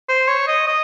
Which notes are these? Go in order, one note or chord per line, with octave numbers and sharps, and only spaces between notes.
C5
C#5
D#5
D#5